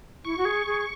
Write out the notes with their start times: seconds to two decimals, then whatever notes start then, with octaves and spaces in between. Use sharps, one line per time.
0.25 E4 C#6
0.38 F#4
0.45 G#4
0.66 G#4